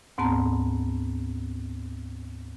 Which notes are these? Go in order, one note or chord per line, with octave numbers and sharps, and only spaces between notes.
D2 G#2 B3 C4 A5 A#5